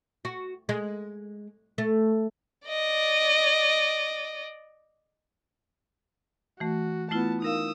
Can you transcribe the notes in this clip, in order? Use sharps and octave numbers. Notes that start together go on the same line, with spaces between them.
F#4
G#3
A3
D5 D#5
E3 A3 F#4
A3 B3 E4 F4 A5
D#4 A#4 F5 D#6 E6